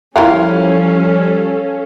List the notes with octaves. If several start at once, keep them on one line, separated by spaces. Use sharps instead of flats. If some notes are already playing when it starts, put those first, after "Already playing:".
F3 G3 C#4 E4 F4 A4 A#4 F5